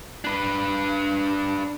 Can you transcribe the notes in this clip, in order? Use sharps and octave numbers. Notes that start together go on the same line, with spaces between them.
D4 B4